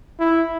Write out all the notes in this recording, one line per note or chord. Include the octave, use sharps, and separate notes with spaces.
E4